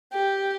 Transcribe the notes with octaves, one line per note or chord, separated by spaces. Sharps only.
G4